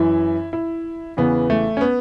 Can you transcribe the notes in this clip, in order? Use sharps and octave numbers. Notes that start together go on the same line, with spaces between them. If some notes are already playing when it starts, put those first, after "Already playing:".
Already playing: F#2 E3 E4
E4
E2 C#3 E3 B3
A3
C#4
B3